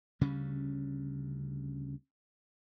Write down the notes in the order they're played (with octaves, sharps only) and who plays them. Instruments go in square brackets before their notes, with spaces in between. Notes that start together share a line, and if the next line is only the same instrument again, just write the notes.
[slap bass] D2 C#3 G3 C#4